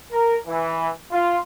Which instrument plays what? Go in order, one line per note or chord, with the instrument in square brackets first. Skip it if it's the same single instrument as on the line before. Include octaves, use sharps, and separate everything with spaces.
[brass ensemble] A#4
E3
F4